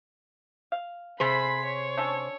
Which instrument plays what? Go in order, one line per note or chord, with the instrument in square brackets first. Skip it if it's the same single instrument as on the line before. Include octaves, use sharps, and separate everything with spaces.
[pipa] F5
[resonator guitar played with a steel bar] C3 G#4 C5 [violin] B5 B6
[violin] C#5
[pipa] C#4 D4 A4